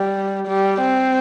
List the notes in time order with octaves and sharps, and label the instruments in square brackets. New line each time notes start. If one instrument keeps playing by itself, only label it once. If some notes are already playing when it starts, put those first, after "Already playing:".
Already playing: [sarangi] G3
G3
C4